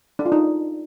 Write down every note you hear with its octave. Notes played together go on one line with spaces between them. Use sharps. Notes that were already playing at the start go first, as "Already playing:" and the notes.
D4
F4
D#4